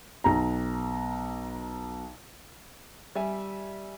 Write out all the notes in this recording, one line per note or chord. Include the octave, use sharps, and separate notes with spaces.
B1 A#5
G3 E5 G#5